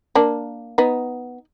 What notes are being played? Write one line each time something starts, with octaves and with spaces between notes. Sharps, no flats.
A#3 D4
B3 D#4